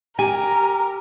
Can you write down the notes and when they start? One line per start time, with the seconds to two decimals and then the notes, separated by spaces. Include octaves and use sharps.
0.19 G4 A#4 G#5